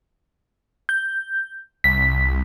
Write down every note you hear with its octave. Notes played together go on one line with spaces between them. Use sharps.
G6
C2 B6